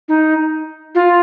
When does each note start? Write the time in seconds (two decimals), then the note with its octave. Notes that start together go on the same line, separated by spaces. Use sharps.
0.08 D#4
0.95 F4